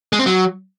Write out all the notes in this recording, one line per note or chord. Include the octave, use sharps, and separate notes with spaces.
G#3
C4
F#3